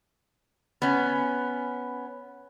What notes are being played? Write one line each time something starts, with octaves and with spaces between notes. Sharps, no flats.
B3 C#4